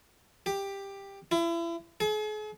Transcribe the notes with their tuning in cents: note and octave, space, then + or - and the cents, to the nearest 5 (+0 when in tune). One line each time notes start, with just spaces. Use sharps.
G4 +10
E4 +35
G#4 +45